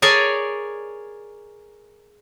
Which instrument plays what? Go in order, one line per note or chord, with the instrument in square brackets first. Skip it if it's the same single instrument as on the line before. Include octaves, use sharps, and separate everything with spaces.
[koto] G#4 A#4 C#5 D5 G#5 A5